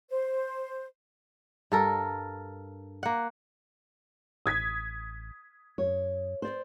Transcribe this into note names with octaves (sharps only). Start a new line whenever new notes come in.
C5
G2 A4 A#4
A#3 F#5
A1 D#6 G#6 B6
F#2 C#5
C5 D5